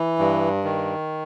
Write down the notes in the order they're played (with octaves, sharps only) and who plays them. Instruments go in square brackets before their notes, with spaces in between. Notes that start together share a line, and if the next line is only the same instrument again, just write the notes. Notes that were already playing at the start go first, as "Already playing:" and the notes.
Already playing: [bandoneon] E3
G2
D#3